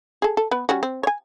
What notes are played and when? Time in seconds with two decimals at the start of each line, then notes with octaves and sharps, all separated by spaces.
0.22 G#4 A4
0.37 A4
0.51 B3 B4
0.69 G3 C#4 F#4
0.83 C4
1.03 C#5 G#5